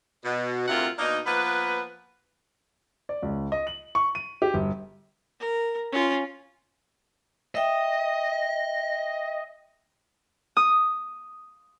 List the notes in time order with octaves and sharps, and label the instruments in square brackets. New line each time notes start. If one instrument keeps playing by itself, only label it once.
[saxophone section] B2
D2 C3 E4 F4 A#4 F#5
B2 A#3 D4 D#4
F3 A#3 B3 B4
[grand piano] D5
C#2
D#5
F#7
C#6
D#7
G4
G1
[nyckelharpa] A#4
C#4 F4
[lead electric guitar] D#5 [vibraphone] E5 G5
[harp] D#6